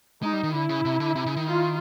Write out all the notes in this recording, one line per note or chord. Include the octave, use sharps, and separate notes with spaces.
G#3 D#4
G3
D#3
D3 E4
C#3
C3
D3
C3
C#3
D#3
F4